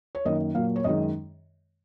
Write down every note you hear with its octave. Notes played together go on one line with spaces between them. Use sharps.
C#5
F#2 D#3 A#3 D#5
A#2 F#3 A#3 F5
C#5
F#2 D#3 G#3 D#5